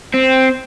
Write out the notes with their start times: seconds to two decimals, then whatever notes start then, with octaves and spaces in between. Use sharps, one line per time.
0.14 C4